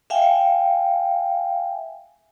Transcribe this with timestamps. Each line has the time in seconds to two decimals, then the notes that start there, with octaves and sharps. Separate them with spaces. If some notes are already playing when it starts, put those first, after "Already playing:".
0.10 E5 F5 G5 G#5